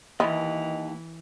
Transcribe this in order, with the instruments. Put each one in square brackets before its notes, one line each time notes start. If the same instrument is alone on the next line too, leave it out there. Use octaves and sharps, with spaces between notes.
[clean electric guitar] D#2 [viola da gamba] E3 [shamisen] E4 [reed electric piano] D#5